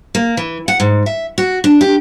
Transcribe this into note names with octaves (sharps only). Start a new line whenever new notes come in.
A#3
E3
F#5
G#2
E5
F#4
D4
G4